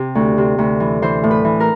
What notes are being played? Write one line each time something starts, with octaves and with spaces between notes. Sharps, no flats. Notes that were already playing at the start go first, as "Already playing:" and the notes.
Already playing: C3 G4
D2
C3
D2
E3
E3 C5
A2
B4
E3
A#4